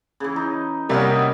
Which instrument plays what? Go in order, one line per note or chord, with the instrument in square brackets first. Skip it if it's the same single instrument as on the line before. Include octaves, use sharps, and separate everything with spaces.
[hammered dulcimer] C#3 E3
D#4
[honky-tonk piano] C3 G3 A#3 [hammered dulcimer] F#3 B3 C#4
[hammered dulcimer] D#5